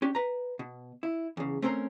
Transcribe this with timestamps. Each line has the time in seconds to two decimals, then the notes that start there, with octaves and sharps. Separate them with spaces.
0.02 C#4 D4 G4
0.15 B4 A#5
0.59 B2
1.03 E4
1.37 E2 C#3
1.62 A3 C4 C#4 A#4 C5 A#5